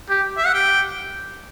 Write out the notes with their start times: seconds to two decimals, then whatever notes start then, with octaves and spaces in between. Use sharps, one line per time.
0.09 G4
0.37 E5
0.46 F#5
0.53 G4 G5